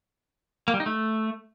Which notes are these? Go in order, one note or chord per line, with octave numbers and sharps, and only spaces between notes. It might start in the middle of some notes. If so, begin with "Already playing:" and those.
A#3
G3
D#4
A3